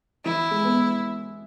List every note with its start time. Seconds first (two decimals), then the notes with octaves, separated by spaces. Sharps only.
0.25 E3 E4
0.51 G#3
0.65 B3